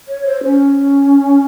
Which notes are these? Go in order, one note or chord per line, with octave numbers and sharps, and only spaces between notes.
C#5
C5
C#4